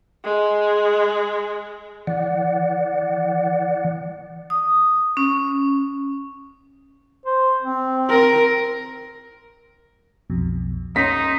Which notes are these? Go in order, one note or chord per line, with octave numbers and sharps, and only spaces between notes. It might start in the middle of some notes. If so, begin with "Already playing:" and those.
G#3
E3 D5 F#5
D#6
C#4
C5
C4
A#4
B1 F2 B2
C#4 D#4 C6 B6